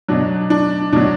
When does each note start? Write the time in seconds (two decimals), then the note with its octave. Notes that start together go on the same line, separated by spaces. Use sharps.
0.08 B2 F#3 D4
0.50 D4
0.93 B2 F#3 D4